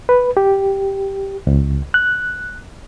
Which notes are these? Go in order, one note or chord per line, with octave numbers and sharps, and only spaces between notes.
B4
G4
C#2
F#6